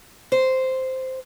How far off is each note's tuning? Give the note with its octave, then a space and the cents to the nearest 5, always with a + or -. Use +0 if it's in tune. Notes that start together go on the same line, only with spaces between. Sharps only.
C5 -5